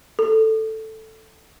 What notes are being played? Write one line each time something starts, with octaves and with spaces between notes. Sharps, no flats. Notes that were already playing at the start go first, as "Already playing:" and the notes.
A4